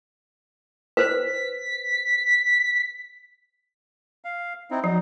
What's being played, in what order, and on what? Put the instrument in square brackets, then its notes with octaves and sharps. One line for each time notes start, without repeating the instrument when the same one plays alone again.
[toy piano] B4 C5 [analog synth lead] B6
[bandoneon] F5
C4 D#4 E4
[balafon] F3 [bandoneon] F#3 D#4